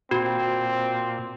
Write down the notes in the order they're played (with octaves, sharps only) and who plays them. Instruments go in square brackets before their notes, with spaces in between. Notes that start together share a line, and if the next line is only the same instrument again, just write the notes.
[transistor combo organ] A#2 [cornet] C4 [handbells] F#4